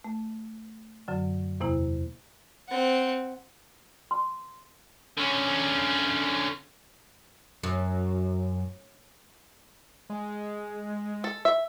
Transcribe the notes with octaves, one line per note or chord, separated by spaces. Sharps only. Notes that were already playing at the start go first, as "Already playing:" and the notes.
A3
F#2 D3 F#3
E2 C3 A#3 E4
C4 F#5
C6
D3 C#4
F#2
G#3
A4
E5